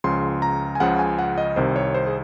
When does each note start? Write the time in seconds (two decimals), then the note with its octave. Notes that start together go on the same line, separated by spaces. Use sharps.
0.04 C#2 C#3 F3 C6
0.42 A#5
0.75 G#5
0.80 C#2 C#3 F3 F#5
0.99 G#5
1.19 F#5
1.38 D#5
1.56 C2 C3 D#3 C5
1.76 C#5
1.94 C5
2.07 G#4